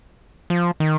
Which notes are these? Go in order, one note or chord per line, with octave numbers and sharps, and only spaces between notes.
F3
D#3